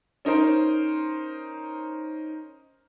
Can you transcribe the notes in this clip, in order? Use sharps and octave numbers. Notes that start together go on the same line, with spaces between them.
C#4 D#4 A#4 C5